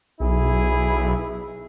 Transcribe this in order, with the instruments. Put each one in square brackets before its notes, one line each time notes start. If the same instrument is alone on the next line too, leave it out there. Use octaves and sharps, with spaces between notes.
[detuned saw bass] B1 [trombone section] E4 G#4